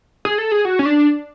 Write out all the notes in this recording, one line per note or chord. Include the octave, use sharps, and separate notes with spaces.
G#4
A4
G#4
F#4
C#4
D4